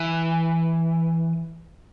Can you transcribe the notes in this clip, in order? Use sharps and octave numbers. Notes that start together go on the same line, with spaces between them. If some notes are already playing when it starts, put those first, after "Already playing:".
Already playing: E3